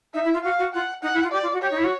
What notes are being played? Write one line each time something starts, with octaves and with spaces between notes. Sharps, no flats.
D#4 E5
E4
F4
F#4 F5
F#4
F4 F#5
D#4 F#5
E4
F4
G4 D5
F4
F#4
G4 C#5
D#4
E4
F#4